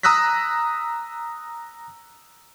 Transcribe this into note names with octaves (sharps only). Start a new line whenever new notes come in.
A#5 D#6 E6 F#6 A#6 B6